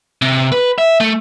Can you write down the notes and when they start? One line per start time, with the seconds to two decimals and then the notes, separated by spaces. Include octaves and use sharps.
0.22 C3
0.52 B4
0.78 E5
1.01 A3